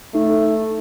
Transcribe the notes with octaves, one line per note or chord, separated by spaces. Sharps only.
A3 D#4